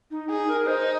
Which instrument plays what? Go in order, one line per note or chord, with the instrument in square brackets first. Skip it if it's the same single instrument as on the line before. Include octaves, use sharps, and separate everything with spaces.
[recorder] D#4
[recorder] D#4 [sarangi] G#4
[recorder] A#4
[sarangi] D#4 [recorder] C5